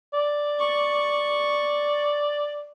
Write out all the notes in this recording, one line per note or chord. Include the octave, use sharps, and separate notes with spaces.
D5
C#6